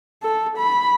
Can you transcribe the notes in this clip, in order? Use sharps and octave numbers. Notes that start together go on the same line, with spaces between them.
A4
B5